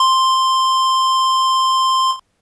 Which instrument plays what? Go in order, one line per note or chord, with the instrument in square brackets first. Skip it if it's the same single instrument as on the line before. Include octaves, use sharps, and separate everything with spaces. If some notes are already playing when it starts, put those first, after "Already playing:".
Already playing: [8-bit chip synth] C6